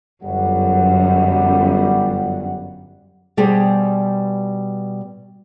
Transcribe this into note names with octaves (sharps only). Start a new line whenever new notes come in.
G1 F#2 G3 F#5
B2 G3 G4 G#4 C5